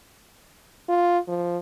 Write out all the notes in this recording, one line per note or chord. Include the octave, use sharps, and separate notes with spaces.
F4
F3